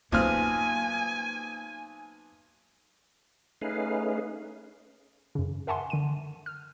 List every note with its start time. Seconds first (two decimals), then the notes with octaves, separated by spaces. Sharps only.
0.12 B1 A#3 C4 F4 G#5 F6
3.61 A3 C#4 D#4 G#4 B4 F5
5.35 F#2 C#3
5.67 A#4 E5 F#5 G#5 A5 C6
5.90 D3 D#7
6.46 F6